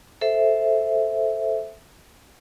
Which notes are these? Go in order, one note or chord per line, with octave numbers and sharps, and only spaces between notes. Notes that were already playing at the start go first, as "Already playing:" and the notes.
A4 C5 E5